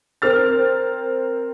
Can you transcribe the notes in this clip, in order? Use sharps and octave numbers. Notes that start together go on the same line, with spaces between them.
C4 A#4 F6 A6